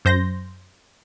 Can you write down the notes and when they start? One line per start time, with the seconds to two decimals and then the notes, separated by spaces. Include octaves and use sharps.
0.05 F#2 C5 G6 A#6